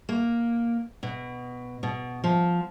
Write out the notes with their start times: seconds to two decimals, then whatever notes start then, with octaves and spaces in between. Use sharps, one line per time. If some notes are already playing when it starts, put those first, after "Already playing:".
0.09 A#3
1.03 B2
1.83 B2
2.24 F3